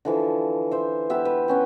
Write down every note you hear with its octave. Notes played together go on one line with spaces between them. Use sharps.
D3 E3 F3
C5 E5
B3 G4 E5
B4
B3 C#4 G5